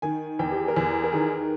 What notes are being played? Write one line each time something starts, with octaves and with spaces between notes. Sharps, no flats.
D#3 G#5
E2 G5
G4
G#4
A#4
E2 B4
A#4
D#3 G#4